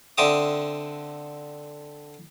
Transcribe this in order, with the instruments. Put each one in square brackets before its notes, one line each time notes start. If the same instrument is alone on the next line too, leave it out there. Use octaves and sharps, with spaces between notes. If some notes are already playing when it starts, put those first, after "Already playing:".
[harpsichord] D3 C4 E5 D6 D#6